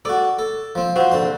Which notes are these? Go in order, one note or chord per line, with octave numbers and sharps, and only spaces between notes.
F#4 A4 D5
A4
F3 C4
F3 C4 F#4
A#1 D3 C6